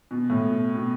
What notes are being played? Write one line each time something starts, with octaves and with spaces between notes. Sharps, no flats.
B2
A2
B2
B2